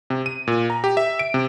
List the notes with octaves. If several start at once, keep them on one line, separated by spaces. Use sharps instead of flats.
C3
D#7
A#2
A#5
G4
E5
D7
C3